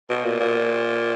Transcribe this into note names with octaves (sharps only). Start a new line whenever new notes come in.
B2
A#2
A#2